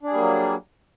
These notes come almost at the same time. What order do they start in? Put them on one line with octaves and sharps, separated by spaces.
D4 G#4 G3 A#3 F#3